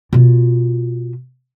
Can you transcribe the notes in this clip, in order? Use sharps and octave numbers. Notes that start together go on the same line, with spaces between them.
B2 F4